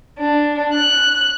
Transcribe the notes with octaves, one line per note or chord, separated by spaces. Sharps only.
D4
F#6